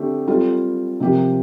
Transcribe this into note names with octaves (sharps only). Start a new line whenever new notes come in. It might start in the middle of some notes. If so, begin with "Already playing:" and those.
Already playing: D3 A3 C4 G4
G3 C4 F4 A4
C3 F3 C4 G4 A#4